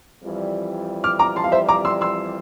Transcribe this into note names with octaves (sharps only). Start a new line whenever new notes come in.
F2 E3 G3
D6 F6
A#5 D6
A5 C6
F5
C5 E5
A#5 D6
C6 E6
C6 E6